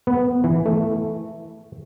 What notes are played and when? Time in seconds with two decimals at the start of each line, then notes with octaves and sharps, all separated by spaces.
0.07 B3
0.44 E3
0.66 A3